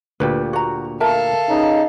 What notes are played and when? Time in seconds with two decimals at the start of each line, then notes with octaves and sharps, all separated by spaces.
0.20 D2 A#2 G4 B4
0.53 F#4 A#5
1.00 A4 A#4 E5 F5 A5
1.49 C#3 D#4